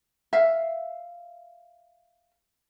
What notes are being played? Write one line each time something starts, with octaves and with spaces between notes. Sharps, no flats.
E5 F5